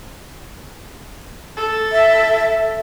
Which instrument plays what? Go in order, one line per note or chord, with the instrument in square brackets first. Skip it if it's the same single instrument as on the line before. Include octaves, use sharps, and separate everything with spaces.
[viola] A4
[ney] E5